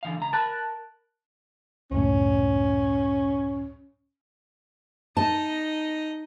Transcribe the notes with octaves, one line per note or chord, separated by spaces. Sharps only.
D3 E3 F5
C#2 A#5
A#4 A5 B5 F#6
C#2 F#2 A2 C#4
D#4 D#5 A5